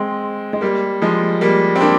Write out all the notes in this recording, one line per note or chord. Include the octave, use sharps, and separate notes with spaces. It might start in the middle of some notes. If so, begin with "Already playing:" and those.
Already playing: G#3 C4
G#3
G3 A#3
F3 G#3
G3 A#3
C4
A#3 D4